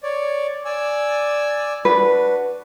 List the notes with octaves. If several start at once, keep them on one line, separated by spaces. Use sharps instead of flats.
C#5 D5
D5 G#5 E6
D4 F#4 B4